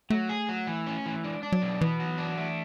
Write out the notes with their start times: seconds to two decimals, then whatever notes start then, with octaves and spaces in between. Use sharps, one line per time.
0.10 F#3 A3
0.29 G#4
0.49 F#3
0.67 E3
0.86 C#4
1.06 E3
1.24 G#3 D4
1.43 D4
1.52 F#3
1.62 B2
1.81 E3 B3
2.00 F#3
2.18 D4
2.37 A3